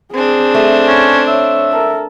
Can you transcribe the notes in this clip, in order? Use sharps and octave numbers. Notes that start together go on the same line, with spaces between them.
C4 D4 G#4
A3
C#4
C#5 E5
A4 A#4